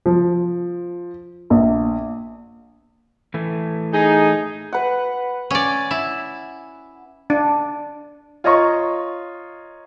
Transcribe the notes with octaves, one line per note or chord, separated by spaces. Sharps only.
F3
A#1
A2 E3 A3
D#4 G#4
B4 F#5
C#4 D5
E4
D4
F4 C#5 D#5 A#5 C#6